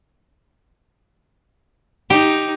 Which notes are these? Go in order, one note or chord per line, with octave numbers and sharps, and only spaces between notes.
D#4 G4